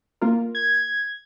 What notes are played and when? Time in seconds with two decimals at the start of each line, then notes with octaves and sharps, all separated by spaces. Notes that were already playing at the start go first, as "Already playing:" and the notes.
0.22 A#3 F4 A#4
0.55 G#6